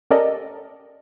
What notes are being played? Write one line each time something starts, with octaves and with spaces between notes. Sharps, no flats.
C#4 G4 A4 A#4 D5 D#5